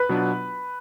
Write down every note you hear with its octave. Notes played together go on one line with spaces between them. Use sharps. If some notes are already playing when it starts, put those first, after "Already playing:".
Already playing: B4 B5
B2 F#3 B3 D4 F4